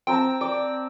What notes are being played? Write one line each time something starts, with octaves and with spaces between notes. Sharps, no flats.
C4 G5 A5 A#5
D5 G5